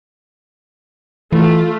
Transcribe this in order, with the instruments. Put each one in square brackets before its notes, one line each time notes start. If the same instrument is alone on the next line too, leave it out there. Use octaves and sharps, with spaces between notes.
[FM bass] E3 [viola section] A3 F4